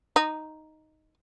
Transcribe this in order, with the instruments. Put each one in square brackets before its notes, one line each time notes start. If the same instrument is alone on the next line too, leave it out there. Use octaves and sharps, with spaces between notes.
[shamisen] D#4